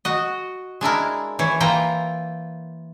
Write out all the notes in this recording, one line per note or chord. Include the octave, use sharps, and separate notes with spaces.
F#4 D#5
G#3 D4 E4 A#4
E3 C#5
E3 A#3 F4 G5 A#5